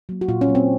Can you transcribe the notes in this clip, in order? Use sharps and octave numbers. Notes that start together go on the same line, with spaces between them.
F#3 A#3
F#4
A#2 F4
C#4
F#3 A#3
C4